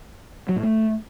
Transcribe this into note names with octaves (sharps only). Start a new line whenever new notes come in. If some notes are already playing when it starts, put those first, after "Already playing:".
F#3
A2
A3